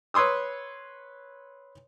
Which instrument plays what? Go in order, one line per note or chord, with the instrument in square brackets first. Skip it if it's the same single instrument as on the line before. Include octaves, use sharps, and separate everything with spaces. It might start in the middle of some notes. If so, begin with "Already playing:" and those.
[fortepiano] B4 C#5 C6 D#6 E6